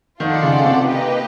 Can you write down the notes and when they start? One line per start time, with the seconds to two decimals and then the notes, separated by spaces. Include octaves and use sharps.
0.20 D#3 F4 A4 D5 F#5
0.43 C#3
0.65 C3
0.87 A#3 D#4 G4 B4 D#5